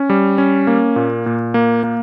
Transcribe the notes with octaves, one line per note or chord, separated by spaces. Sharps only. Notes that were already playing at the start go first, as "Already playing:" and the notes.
Already playing: C#4
G3
C#4
A#3
A#2
A#2
A#3
A#3